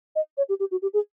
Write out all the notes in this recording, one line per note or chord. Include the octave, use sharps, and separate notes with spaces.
D#5
C#5
G4
G4
F#4
G4
G#4